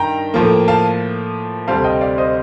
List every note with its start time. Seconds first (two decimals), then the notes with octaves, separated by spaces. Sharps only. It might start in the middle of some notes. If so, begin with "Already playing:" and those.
Already playing: G2 D#3 G5 A#5
0.34 A2 F3 A#3
0.68 F5 A5
1.68 D2 C3 G3 C4 F5 A5
1.84 D#5 G5
2.01 D5 F5
2.18 C5 D#5